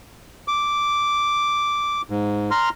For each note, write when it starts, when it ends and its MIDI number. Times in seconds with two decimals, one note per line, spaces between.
0.48 2.02 86
2.10 2.50 44
2.51 2.69 82
2.51 2.69 84
2.51 2.69 89